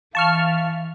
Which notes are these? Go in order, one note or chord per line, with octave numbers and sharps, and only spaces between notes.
E3 F5 A5 C#6 F6